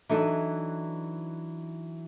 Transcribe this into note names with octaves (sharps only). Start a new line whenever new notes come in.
E3 F#3 D4 D#4 A4